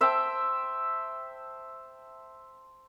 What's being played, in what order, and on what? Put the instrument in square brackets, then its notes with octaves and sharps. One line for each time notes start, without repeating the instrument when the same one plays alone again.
[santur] C5 E5 G5 A5